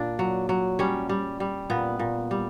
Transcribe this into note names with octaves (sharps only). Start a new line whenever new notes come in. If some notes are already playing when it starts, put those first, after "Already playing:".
Already playing: A#2 D4
F#3
F#3
G3 C#4
G3
G3
A#2 B3
A#2
G3